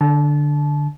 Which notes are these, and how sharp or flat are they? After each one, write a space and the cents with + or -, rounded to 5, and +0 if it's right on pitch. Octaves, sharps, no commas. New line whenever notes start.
D3 +0 A5 -25